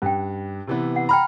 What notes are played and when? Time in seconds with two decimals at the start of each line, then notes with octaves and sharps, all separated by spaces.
0.02 G2 C#4 G5
0.67 C3 E3 B3
0.96 F#5
1.09 G5 A#5 B5 F6